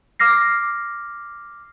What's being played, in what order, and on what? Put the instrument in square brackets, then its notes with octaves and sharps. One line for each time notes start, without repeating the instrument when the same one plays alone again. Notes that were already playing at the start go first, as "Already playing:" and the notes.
[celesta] D6 F6 A#6 C7